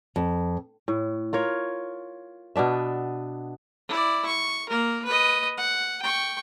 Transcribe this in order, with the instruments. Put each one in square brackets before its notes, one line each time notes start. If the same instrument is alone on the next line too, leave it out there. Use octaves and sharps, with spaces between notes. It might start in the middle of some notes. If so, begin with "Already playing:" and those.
[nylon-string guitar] F2
[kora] A2
F4 A#4 C#5
B2 B3 D4 E5
[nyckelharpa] E4 D5
C#6
A#3 A#4
B4 D#5
F#5
G5 C#6